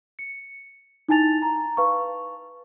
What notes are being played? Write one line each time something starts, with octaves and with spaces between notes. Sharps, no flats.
C#7
D#4 E4 G#5 A5 A6 F7
A#5
B4 F5 A5 C#6